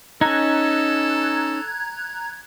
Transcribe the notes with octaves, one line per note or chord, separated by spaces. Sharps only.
C#4 D#4 A4 A#5 F#6 G#6